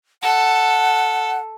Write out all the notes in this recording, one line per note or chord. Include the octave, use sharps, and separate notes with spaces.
A4 F#5